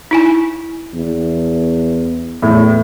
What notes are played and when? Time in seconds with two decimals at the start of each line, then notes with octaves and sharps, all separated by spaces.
0.11 D#4 E4 G#5
0.94 E2
2.42 E2 A2